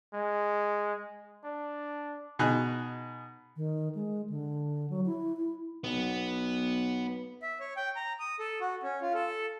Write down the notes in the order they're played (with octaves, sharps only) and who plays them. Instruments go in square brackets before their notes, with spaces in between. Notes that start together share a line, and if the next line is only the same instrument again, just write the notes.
[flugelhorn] G#3
D4
[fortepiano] B2 D#4 G#4 F#6
[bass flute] D#3
G#3
D3
F#3
E4
E4
[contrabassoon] B1 [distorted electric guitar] B3
[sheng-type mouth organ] E5
C#5
G5
A#5
D#6
A4
F#4
C#4
F4
A4